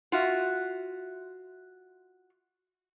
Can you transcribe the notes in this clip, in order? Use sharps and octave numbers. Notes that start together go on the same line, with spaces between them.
F4 F#4 E5